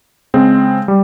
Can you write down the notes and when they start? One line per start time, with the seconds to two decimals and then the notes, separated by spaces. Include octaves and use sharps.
0.34 C#3 G#3 C4
0.88 G3